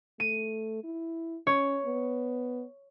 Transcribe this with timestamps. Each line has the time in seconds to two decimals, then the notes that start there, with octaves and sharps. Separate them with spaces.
0.20 A3 D#7
0.84 E4
1.47 C#4 C#5
1.85 B3